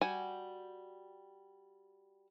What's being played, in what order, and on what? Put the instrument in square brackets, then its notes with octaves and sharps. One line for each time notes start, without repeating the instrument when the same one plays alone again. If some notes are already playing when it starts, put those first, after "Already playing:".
[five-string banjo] G3 F#4 G#5